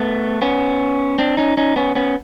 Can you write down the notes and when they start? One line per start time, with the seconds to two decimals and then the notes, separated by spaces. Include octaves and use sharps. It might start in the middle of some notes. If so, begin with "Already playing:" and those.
Already playing: A3 B3
0.42 B3 C#4
1.18 C4 D4
1.37 C#4 D#4
1.57 C#4 D#4
1.76 B3 C#4
1.95 B3 C#4